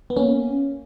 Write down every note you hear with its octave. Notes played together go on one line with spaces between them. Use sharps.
B3
A#3 C#4